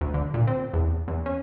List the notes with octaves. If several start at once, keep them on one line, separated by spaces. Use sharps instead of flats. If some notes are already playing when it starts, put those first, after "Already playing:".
D2
D3
A#2
C4
E2
E2
C#4